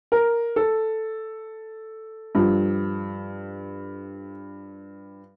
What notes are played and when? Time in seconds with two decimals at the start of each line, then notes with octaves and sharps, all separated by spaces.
0.12 A#4
0.56 A4
2.35 G2 F3